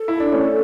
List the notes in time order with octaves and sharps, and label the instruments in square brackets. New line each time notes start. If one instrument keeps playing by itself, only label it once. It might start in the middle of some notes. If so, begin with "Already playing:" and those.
Already playing: [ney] A4
[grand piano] E4
D4
A3 C#4